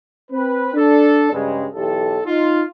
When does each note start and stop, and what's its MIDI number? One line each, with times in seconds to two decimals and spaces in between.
0.31 0.70 60
0.31 0.70 71
0.74 1.30 62
0.74 1.30 69
1.33 1.66 43
1.33 1.66 49
1.33 1.66 56
1.74 2.20 35
1.74 2.20 52
1.74 2.20 67
1.74 2.20 69
2.26 2.63 63
2.26 2.63 65